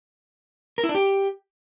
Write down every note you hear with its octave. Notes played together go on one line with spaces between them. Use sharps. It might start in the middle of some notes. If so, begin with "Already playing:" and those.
A#4
E4
D4
G4